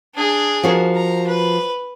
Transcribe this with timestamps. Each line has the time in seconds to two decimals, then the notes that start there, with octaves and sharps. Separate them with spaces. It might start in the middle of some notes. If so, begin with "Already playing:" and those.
0.15 D4 G#4
0.63 F3 F#4 A#4
0.95 A#5
1.27 B4